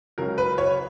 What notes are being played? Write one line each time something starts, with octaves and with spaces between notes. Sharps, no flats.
C#2 C#3 F#3 A#4
B4
C#5